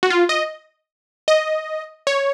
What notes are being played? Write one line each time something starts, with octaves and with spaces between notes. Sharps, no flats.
F#4
F4
D#5
D#5
C#5